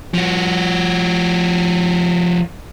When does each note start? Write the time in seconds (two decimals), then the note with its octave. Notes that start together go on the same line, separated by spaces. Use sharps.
0.14 F3 F#4